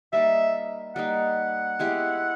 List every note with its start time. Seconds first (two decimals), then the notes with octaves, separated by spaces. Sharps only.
0.13 G3 A#3 D#4 E5
0.96 G3 A#3 D#4 F#5
1.79 G#3 B3 E4 G4